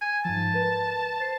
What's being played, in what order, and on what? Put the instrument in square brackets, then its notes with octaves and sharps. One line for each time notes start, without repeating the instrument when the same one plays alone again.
[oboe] G#5
[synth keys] G#2 F3 [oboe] A5
[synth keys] A#4 B4
C5 C7